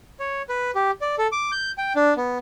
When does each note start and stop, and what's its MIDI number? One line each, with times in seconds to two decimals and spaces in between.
0.20 0.42 73
0.49 0.71 71
0.75 0.91 67
1.01 1.15 74
1.18 1.27 69
1.32 1.51 86
1.52 1.72 91
1.78 1.93 79
1.96 2.14 62
2.17 2.38 59